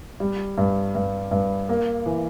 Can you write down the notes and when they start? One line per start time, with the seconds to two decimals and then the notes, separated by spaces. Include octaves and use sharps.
0.20 G3
0.58 G2
0.95 G2
1.31 G2
1.69 A#3
2.06 E3